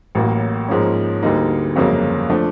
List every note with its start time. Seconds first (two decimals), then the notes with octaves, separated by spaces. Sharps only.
0.15 A1 A2 F#3 A#3
0.69 G#2 F3 A#3 C#4
1.23 D2 D3 G3 A#3 D#4
1.76 G1 F2 C#3 F#3 A#3
2.30 F3 A3 D4